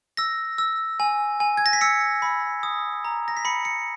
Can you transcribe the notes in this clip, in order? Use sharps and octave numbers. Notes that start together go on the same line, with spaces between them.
E6 A#6
E6
G#5
G#5
G#6
A#6
B6
E6 C#7
B5
D#6
A#5
A#6
B6
B5 C#7
C#7